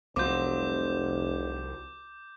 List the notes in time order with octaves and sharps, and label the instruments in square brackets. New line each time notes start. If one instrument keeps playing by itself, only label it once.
[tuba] F1 [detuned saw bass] C2 [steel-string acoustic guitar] F3 F#3 C4 [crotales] D6 G6